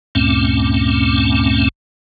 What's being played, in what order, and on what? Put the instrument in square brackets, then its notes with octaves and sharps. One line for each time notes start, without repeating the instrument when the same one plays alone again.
[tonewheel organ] D2 G2 A#2 A3 C4 C#4